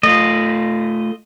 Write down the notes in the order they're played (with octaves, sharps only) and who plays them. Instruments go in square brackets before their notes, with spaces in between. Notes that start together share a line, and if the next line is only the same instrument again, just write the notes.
[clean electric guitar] A3 F4 [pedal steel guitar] D#5